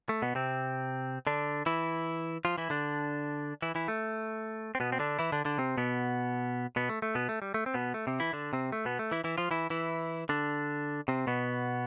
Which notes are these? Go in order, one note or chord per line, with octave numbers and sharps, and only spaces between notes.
A3
B2 B3
C3 C4
D3 D4
E3 E4
F3 F4
E3 E4
D3 D4
E3 E4
E3 E4
A3
C4
B2 B3
C4
D3 D4
E3 E4
D3 D4
D3 D4
C3 C4
B2 B3
B2 B3
A3
A3
B2 B3
A3
G3
A3
C4
B2 B3
A3
C3 C4
E3 E4
D3 D4
C3 C4
A3
B2 B3
A3
E3 E4
E3 E4
F3 F4
E3 E4
E3 E4
D3 D4
C3 C4
B2 B3